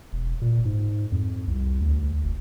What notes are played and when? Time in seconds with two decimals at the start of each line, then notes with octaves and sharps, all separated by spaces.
0.13 E1
0.42 A#2
0.65 G#2
1.12 F2
1.48 C2
1.81 D2
2.24 F1